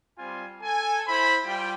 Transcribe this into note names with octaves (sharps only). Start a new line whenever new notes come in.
G3 C4 F4 G#5
A4 G#5
E4 C5 B5
G3 F4 G5